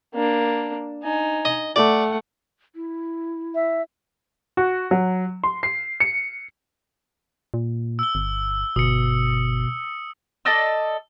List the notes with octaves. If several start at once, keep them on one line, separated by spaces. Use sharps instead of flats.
A#3 D4
D#4 G#5
D#5
A3 D5 F#5
E4
E5
F#4
F#3
C6
C7
C#7
A#2
E6 G7
G1
G1 B2 D#6 C#7
A4 D5 D#5 E6